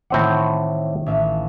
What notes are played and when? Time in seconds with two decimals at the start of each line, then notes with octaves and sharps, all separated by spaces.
0.10 A2 D#3 C4 F#5 D6
1.06 A1 E5 F5